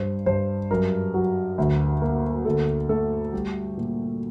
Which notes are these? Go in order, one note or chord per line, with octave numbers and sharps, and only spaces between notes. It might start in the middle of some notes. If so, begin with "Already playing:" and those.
Already playing: G2 C5
G2 C5
F#2 A#4
F#3
D2
A#3
D2 A4
A3 A4
G3 G4
A#2